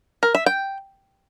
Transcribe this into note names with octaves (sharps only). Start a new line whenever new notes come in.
A#4
E5
G5